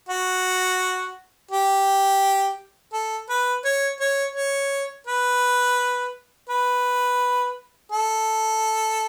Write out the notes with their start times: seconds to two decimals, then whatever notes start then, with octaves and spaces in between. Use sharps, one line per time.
0.09 F#4
1.51 G4
2.93 A4
3.30 B4
3.65 C#5
4.00 C#5
4.35 C#5
5.07 B4
6.49 B4
7.92 A4